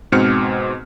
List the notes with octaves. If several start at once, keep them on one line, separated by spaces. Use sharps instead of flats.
G#2 B2 C4 D6 F6 C#7